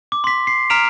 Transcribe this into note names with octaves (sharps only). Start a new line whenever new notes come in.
D6
C6 B6
C7
A#5 F6 B6 D7 F7